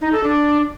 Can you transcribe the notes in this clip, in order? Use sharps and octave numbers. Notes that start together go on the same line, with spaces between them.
D#4
A4
D4